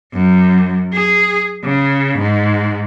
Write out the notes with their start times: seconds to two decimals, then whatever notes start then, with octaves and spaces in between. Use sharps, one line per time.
0.13 F#2
0.93 G#4
1.64 C#3
2.18 G#2